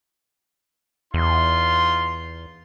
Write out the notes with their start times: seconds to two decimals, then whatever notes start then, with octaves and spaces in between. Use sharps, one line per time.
1.14 E2 D#4 F4 C6